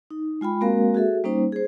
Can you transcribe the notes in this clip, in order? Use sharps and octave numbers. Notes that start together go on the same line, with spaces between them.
D#4
G#3 F4 G5 B5
G#3 A#3 C4 F#4 A#4 F5
F#4 G#4 A4 E5
G3 A#3 C#4 D#4 C5
G#4 C5